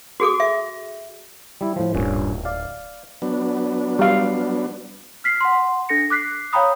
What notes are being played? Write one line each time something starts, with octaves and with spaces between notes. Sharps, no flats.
F#4 G#4 A4 D6
E5
G3 E4
A2 F3
D1 G2 A#2 C#4
D5 F5
F#3 B3 D4
G3 F5
F6 B6 C7
F#5 C6
D4 A4 A#6 C#7
D6 F#6 B6 C7
C#5 F5 G5 A#5 B5 D#6